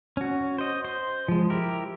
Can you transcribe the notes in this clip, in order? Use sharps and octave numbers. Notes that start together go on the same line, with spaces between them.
C#4 F#4
C5 D#5
C5
F3 G#3
E4 G4 A#4